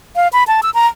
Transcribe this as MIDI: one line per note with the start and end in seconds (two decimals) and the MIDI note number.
0.16 0.28 77
0.33 0.44 83
0.47 0.61 81
0.63 0.70 88
0.74 0.87 82